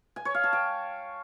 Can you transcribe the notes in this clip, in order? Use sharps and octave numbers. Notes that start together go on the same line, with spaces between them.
G#5
C#5
F5
A5
G5